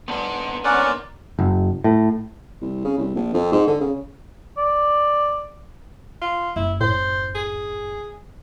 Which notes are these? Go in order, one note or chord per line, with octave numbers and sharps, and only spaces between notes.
C#2 G#2 B3 D4
G#2 C#4 A#4 D5 F#5
F#1
A2
C2
C#3
C2
A#1
F2
G#2
D3
C#3
D5
F4
F#1 E4
A2 C5
G#4